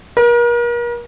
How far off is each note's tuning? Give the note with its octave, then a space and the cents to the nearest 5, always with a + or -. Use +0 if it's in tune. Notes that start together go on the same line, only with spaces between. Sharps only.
A#4 +40